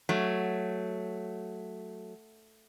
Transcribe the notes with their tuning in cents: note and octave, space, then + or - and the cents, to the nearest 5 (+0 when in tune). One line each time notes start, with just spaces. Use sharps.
F#3 +0 A3 +0